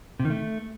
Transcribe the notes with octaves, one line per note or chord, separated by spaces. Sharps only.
C3
D#3
A3